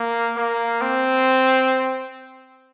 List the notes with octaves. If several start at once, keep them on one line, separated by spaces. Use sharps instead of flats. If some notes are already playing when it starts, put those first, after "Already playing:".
Already playing: A#3
A#3
C4